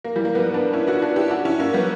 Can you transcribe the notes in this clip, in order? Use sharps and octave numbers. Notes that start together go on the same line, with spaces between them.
A#3
E3 G3
A#3
G3 B3
B3 D4
C#4 E4
D4 F#4
D4 F#4
E4 G4
D4 F#4
C#4 E4
A#3 C#4
G3 B3